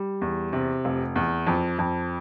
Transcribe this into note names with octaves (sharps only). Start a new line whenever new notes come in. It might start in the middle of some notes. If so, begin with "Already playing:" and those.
Already playing: G3
E2
C3
F1
E2
F2
F2